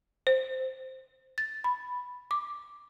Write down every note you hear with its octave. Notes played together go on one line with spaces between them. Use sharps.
C5
A6
B5
D6